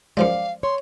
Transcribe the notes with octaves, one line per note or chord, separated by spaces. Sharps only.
F#2 F3 G#3 D5 F5
C#5 C6